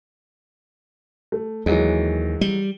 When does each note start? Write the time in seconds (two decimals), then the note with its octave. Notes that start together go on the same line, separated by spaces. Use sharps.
1.32 A3
1.66 D#2 E3 F#3 G#3
2.41 G3